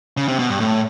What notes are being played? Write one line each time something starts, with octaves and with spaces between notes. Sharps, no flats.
C#3
C3
B2
G2
A2